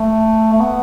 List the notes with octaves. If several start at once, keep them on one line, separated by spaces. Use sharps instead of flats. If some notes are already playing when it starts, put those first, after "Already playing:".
Already playing: A3
A3
B3